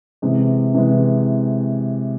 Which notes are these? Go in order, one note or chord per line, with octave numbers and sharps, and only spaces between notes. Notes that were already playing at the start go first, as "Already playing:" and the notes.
C3 E3 G#3
C3 E3 G#3